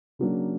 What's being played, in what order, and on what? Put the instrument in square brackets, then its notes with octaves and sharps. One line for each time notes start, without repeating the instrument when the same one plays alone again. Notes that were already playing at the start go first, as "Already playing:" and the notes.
[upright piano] C#3 F#3 A#3 D4